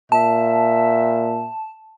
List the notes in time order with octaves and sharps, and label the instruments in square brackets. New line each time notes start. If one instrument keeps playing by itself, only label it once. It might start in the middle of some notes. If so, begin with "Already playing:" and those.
[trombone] A#2 [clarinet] E5 [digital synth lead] A5